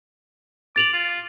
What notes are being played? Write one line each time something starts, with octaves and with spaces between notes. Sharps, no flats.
D6 A6 F7 F#7
F4